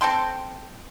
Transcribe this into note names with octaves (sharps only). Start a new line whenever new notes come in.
C4 A4 G5 C6